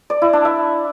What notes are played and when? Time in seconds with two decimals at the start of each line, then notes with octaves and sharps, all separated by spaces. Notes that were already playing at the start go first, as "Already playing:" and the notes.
0.10 D5
0.22 E4
0.33 D4
0.45 E5